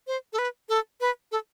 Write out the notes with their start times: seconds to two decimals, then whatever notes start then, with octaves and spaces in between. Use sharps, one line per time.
0.07 C5
0.33 A4
0.38 B4
0.69 A4
1.01 B4
1.32 A4